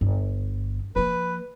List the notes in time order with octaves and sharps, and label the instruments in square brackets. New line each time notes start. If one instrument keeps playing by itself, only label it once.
[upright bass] G1
[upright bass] F3 A#3 [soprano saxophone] B4